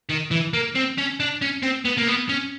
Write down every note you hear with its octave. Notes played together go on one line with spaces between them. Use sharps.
D#3
E3
A#3
C4
C#4
D4
C#4
C4
B3
A#3
B3
C#4